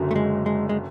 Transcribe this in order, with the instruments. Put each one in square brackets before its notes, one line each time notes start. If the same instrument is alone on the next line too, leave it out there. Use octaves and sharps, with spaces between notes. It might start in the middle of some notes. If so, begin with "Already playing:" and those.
Already playing: [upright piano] F#1 F#2 D3 F#3
[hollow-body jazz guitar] A3
G#3
G#3
G#3